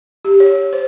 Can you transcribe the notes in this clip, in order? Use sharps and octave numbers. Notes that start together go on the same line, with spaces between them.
G4
C#5
C5